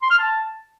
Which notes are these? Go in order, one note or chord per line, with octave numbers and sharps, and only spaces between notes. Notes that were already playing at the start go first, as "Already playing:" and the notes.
C6
F6
A5